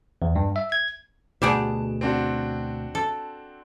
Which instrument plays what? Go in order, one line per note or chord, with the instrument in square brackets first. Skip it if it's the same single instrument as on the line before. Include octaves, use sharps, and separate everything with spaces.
[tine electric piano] E2
G2
E5
G#6
[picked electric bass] D2 B2 [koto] G3 G#4 F#5 [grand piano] A5 D7 E7
[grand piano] C4 D4 F#4
[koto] A4